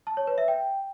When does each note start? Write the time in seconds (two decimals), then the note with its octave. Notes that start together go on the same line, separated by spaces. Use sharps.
0.07 A5
0.17 C#5
0.27 B4
0.38 E5
0.48 G5